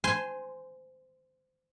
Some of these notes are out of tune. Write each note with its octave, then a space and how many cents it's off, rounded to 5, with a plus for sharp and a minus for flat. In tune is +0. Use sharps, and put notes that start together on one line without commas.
C5 -20 G#5 +0 C6 +0